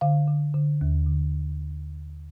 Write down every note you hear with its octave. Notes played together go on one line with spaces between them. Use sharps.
D3 F5
D3
D3
D#2
D3